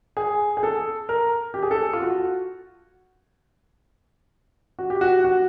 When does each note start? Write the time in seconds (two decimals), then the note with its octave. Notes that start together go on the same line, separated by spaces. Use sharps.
0.17 G#4
0.57 G#4
0.63 A4
1.09 A#4
1.54 G4
1.63 G#4
1.71 A4
1.93 F4
2.02 F#4
4.79 F#4
4.90 G4
5.01 F#4
5.24 F#4